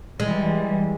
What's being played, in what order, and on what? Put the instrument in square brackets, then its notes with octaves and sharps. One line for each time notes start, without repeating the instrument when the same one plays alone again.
[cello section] E3 G3 [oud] G#3